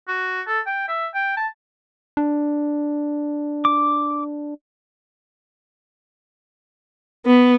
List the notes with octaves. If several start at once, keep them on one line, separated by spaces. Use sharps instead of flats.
F#4
A4
G5
E5
G5
A5
D4
D6
B3